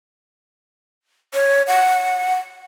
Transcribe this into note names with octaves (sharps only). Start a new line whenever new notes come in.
C#5
F#5